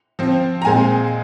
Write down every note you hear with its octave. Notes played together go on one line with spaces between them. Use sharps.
F3 C4
A#5
A#2 G#3 C4 G#5